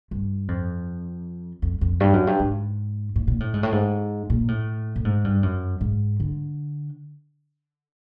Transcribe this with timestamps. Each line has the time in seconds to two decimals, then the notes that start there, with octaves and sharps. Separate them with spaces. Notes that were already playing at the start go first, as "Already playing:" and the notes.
0.11 G2
0.48 F2
1.62 F2
1.81 F2
2.00 G2
2.13 F#2
2.27 G2
2.39 G#2
3.16 A2
3.28 A#2
3.40 A2
3.54 G#2
3.63 A2
3.72 G#2
4.30 A#2
4.48 A2
4.96 A2
5.05 G#2
5.24 G2
5.43 F#2
5.81 G#2
6.20 D3